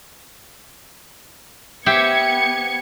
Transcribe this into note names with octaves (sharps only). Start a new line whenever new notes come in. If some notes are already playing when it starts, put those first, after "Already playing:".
B3 G4 C5 E5 G#6 C#7